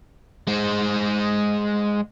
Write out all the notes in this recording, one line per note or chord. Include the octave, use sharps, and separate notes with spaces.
G#3 C5